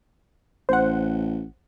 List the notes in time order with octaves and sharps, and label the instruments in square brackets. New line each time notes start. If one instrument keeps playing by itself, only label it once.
[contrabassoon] A1 [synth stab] C5 F#5